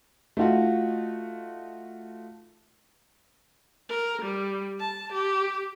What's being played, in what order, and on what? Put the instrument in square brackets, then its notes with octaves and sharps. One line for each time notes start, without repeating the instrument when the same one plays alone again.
[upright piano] A3 D#4 F4 F#4
[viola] A#4
G3
A5
G4